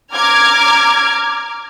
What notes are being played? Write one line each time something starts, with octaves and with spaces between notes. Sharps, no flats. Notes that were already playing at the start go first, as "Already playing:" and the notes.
A#5 D6 F6 G#6